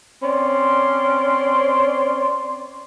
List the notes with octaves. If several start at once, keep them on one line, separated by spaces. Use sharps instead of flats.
C4 C#4 D5 C6